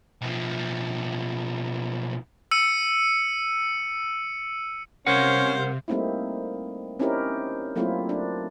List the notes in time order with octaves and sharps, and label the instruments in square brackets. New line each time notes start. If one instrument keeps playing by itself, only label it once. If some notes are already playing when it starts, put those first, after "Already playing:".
[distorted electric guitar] B1 F3
[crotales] E6 C#7 D#7
[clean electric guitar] C2 A#4 F#5 [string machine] C3 [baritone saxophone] C#4 [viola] C5 F5
[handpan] G3 A3 A#3 C4 D#4 E4
C4 C#4 D#4 E4 G4 A#4
F#3 A3 A#3 C4 E4 F4
D4